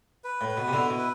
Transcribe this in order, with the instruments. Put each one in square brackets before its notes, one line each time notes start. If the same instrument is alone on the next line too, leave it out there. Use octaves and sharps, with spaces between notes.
[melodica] B4
[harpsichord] A2
[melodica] B4
[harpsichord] B2
C3
[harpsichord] B2 D3 [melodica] E4
[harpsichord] B2
[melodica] B4